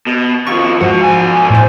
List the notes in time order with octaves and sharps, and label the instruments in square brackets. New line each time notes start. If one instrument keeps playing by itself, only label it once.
[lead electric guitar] B2
[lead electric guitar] D#2 F3 [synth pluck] C#6
[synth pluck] G#2 F3 F#4 [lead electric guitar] B2 F#5
[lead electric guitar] B1 G#5
[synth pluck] A2 C5